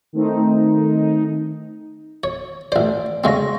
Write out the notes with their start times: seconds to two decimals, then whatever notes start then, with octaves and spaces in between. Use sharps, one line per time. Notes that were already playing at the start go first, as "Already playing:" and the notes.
0.13 D#3 A3 C4 D#4
2.24 C#5
2.72 A1 C5 D5
3.24 C#3 G#3 C4 C6 C#6 A#6